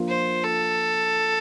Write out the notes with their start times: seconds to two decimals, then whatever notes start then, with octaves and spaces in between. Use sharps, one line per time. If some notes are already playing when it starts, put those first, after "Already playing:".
Already playing: F3 A#3 D4 F4
0.08 C5
0.44 A4